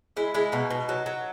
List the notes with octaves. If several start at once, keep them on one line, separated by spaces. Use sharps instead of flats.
G#3 E4
G#3 E4
B2 D#4
B2
F#3
F#3